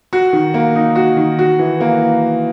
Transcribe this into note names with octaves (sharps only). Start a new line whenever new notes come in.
F#4
D#3
A#3
D#4
F#4
D#3
F#4
E3
A#3